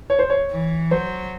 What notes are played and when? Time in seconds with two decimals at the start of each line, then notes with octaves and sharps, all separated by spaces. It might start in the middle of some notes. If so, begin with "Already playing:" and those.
0.10 C#5
0.19 C5
0.30 C#5
0.51 E3
0.91 F#3 C5